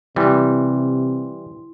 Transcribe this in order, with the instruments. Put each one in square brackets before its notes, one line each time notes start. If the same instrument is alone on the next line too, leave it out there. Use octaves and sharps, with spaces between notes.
[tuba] C3 [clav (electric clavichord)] E3 G3 [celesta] E4 C6